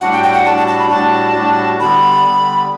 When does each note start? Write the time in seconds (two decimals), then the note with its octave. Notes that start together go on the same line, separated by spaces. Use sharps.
0.01 A2 G3 D4 F#4 F#5
0.12 G5
0.23 G5
0.34 F#5
0.45 A2 G3 D4 F#4 A5
0.57 A5
0.68 A5
0.79 B5
0.90 A2 G3 D4 F#4 A5
1.35 A2 G3 D4 F#4
1.79 D3 G3 B3 B5
2.24 D3 G3 B3